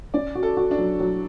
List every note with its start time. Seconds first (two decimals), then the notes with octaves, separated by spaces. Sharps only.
0.14 C#4 D5
0.35 F#4
0.43 A4
0.57 F#4
0.71 D4
0.78 F#3
1.00 F#3